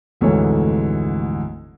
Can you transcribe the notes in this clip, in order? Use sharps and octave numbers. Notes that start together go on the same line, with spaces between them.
F1 D2 G#2 E3 A4 C#5